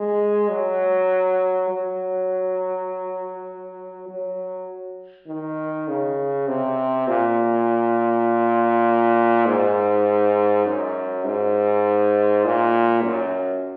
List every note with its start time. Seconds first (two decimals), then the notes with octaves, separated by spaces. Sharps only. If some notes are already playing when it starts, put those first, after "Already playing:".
Already playing: G#3
0.49 F#3
1.69 F#3
4.09 F#3
5.27 D#3
5.88 C#3
6.47 C3
7.07 A#2
9.46 G#2
10.66 F#2
11.24 G#2
12.45 A#2
13.04 F#2